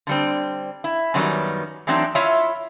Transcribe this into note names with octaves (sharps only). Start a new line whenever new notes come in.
D3 G3 C4
E4
F#2 D#3 F#3 G3 B3 D#4
E3 F#3 A3 C4 D4 D#4
E4 F4 C#5 D#5 E5